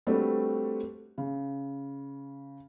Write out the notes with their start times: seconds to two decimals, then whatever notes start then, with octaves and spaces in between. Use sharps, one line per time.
0.07 G3 A3 C4 D4 F#4 B4
1.18 C#3